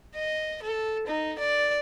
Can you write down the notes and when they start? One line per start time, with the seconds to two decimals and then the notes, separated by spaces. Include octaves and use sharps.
0.15 D#5
0.63 A4
1.07 D#4
1.39 D5